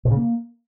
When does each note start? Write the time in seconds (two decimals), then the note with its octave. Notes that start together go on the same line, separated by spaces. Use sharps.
0.05 A#2
0.11 C#3
0.16 A#3